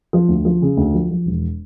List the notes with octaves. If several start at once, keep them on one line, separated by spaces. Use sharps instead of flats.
F3
D2
F3
C#3
D2
F3
F3
E1